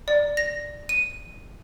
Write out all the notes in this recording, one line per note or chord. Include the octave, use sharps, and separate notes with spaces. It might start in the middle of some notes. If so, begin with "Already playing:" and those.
D5
A#6
D#7